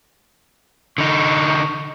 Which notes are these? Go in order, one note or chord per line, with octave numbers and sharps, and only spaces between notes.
D3 D#4 C#6